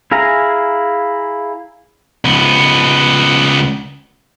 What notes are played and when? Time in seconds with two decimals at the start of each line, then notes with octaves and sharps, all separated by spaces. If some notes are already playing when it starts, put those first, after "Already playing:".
0.11 E4 G#4 F5 G#5 A#5
2.25 C#2 B3